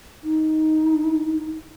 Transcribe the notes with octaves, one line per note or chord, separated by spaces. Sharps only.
D#4